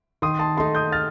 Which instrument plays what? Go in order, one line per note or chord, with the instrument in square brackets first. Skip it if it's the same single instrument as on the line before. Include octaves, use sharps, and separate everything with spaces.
[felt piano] D#3 [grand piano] C6 D#6
[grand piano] A5 C6
[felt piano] A3 D#4 [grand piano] A5 C6
[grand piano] D#6 G6
F6 A6